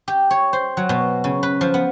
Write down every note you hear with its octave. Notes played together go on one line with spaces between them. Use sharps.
G4
C#5
C5
F#3
B2
C#3
B4
F3
B3